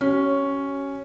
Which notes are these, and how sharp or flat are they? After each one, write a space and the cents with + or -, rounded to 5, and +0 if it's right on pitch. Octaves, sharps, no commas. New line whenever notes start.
C#4 +0 G4 -45